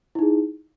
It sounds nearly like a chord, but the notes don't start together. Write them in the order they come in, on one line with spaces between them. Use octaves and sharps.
E4 D#4 G#4